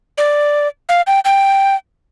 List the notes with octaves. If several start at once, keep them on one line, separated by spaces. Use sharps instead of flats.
D5
F5
G5
G5